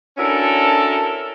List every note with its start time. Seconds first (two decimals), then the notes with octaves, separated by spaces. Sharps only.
0.18 C#4 D4 E4 F#4 A4 A#4